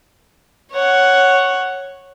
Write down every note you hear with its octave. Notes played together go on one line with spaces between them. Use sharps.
C#5 F#5